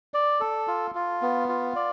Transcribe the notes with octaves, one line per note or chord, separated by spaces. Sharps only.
D5
A4
F4
F4
B3
F4
D5